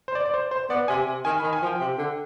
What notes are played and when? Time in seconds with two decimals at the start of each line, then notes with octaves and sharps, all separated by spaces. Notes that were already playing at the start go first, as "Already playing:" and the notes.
0.08 C5
0.15 D5
0.26 D5
0.34 C5
0.51 C5
0.70 B3 D5
0.88 C3 G#5
1.08 C3
1.25 D#3 G#5
1.40 B5
1.43 D#3
1.53 G#5
1.62 F3
1.67 G5
1.80 C3
1.98 D3